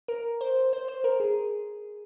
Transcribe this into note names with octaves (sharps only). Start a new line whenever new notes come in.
A#4
C5
C5
C5
A#4
G#4